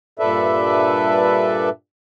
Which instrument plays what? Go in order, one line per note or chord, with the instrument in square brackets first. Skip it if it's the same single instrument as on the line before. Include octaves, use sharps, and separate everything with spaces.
[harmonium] G2 A#2 A4 B4 D5 E5